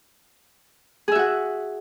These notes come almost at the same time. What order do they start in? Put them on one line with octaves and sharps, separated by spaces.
G#4 E5 F#4 F#5